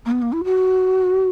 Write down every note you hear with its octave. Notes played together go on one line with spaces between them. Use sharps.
A#3
B3
A#3
E4
F#4